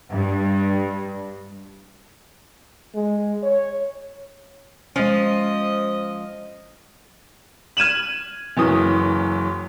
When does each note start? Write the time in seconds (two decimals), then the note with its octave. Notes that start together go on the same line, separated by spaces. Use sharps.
0.13 G2
2.95 G#3
3.43 C#5
4.96 F3 G#3 C#4 D#5
7.77 F6 G#6 D#7 E7 F#7
8.57 F#1 F#2 E3 D#6